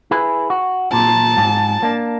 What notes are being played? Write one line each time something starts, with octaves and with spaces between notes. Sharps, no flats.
E4 G#4 B4
F#4
A#2 A5
G#2
A#3 D4